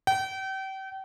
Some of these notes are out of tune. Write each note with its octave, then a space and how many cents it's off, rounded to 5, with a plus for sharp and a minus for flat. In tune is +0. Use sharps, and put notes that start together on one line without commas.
G5 -35